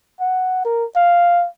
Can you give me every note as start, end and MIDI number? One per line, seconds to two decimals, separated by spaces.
0.21 0.65 78
0.65 0.85 70
0.96 1.47 77